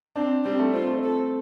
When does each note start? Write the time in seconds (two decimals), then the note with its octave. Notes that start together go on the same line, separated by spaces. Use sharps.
0.16 C4 D4
0.44 G3 C4
0.59 A3
0.74 C4 F4
0.87 A3
0.99 C4 A4